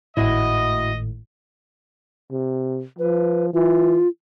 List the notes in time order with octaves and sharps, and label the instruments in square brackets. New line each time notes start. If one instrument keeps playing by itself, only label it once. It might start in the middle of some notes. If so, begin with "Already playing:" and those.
[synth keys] G#1 A2 [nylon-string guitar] E4 F#4 [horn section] D#5
[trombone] C3
[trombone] F3 [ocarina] B4
[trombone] E3 [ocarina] F4